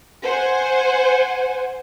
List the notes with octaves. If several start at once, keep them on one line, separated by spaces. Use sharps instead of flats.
C5 F#5 G#5